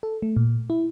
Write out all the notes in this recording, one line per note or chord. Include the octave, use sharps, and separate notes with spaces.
A4
A3
A#2
E4